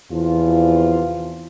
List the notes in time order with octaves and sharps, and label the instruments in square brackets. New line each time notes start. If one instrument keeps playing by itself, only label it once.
[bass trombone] E2 [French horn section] C3 F3 F4